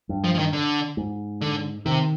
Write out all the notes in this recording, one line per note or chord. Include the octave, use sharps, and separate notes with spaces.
G2
F3
F3
D#3
D3
G#2
D3
C3 D#3